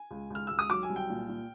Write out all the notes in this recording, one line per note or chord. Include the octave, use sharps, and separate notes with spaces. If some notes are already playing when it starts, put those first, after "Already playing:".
Already playing: G#5
C#2
C#2 F6
C#2 E6
D#6
F#3 D6
G#5
C2
G5
A#2
A#2